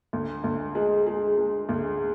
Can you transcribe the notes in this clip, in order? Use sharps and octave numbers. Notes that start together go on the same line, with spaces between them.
D2
D2
G#3
G#3
G#3
D2